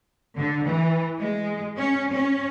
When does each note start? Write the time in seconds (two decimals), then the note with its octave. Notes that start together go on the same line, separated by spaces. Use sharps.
0.37 D3
0.66 E3
1.18 G#3
1.77 C#4
2.12 C#4